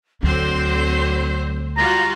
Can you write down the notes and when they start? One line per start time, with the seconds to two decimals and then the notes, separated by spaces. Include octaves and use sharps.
0.23 D2 D3 F#3 C4 C5
1.77 G3 F4 F#4 A#5